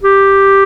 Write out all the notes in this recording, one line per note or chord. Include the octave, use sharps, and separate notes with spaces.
G4